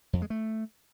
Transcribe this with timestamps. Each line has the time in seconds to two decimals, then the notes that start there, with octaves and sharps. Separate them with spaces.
0.13 F2
0.22 G#3
0.30 A3